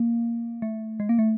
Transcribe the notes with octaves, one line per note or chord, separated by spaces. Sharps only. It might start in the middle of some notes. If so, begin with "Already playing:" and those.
Already playing: A#3
A3
G#3
A#3
A3